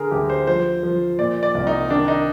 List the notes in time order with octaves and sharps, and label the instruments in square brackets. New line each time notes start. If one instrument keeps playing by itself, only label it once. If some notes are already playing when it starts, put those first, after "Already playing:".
Already playing: [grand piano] D3 G#4 A#4
D2 G4
C5
F3 C5
F3
A#2 D5
D5
C2
D#4
D#3 D4
D#4